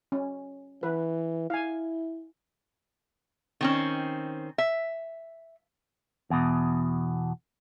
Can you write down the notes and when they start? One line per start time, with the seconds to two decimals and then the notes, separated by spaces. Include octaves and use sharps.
0.12 C#4
0.83 E3 B4
1.50 E4 F5 G#5
3.61 D#3 C4 C#4
4.58 E5
6.30 E2 B2